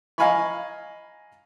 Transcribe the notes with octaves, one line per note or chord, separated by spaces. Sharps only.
D#5 F5 G#5 A#5 B5 C#6